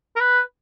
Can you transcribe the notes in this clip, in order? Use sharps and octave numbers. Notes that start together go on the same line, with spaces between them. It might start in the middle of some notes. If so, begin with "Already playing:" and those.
A#4
B4